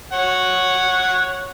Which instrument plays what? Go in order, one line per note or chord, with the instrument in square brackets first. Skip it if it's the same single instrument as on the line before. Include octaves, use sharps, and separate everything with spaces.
[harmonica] C#5 F#5